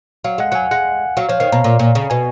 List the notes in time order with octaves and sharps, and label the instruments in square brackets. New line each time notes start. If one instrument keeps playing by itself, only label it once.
[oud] F#3 [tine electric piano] F5
[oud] G#3 [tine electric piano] F#5
[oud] F#3 [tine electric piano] F#5 G#5
[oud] G#3 [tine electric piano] F#5
[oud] F#3 [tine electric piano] F5
[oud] F3 [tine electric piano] C#5
[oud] D#3 [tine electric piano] F5
[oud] B2 [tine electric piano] A#5
[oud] A#2
A#2
C#3
[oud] B2 [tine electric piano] G#5